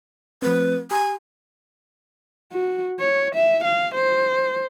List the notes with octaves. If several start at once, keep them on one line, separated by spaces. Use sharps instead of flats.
F3 A3 C4 B4
G4 G#5 A#5 C6
F#4
C#5
E5
F5
C5